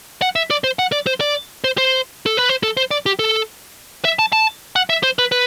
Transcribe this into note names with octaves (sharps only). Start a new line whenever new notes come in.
F#5
E5
D5
C5
F#5
D5
C5
D5
C5
C5
A4
B4
C5
A4
C5
D5
G4
A4
E5
A5
A5
F#5
E5
C5
B4
B4